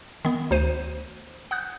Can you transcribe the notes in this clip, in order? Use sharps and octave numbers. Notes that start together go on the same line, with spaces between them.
D#3 B3
D2 C5 D#7
F#5 D#6 F#6 G6